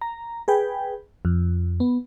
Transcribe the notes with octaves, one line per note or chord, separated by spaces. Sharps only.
A#5
G#4 B4 G5
F2
B3